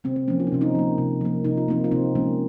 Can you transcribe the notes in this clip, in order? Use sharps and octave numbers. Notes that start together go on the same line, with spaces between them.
C3 C4
C4
F3 A#3 C#4
F4
D#4
C3 C#4
C4 D#4
F3 A#3
C3
F3 A#3
C3 D#4
F4
F3 A#3 C4 D#4
F4
C3 C4 D#4
F3 G#3 A#3 C#4